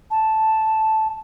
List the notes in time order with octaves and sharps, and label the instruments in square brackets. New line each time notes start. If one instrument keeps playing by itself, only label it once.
[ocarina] A5